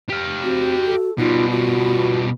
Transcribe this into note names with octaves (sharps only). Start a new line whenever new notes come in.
G4 F5
C4 F#4
A4
B2 G3 D#4 F4
F4 F#4